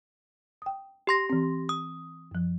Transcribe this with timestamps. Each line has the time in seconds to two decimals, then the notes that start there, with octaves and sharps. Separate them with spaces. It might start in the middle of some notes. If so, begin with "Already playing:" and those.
0.62 G5 D#6
1.07 G4 C6 A#6
1.30 E3 C4
1.69 D#6
2.31 F#2 F3